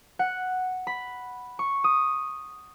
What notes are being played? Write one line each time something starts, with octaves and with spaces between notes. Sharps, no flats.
F#5
B5
C#6
D#6